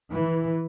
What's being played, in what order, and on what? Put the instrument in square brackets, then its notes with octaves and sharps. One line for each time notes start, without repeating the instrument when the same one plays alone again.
[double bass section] E3